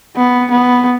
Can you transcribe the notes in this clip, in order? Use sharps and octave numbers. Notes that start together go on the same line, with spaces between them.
B3
B3